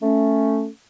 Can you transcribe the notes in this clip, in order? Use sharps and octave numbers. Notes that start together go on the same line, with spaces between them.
A3 C#4